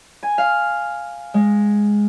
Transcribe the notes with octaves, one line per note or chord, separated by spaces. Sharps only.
G#5
F5
G#3